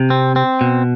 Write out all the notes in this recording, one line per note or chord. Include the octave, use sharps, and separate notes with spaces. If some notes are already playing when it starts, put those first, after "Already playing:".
Already playing: C3
C4
C4
B2